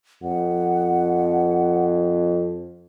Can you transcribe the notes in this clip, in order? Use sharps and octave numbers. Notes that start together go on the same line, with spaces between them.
F2 F#5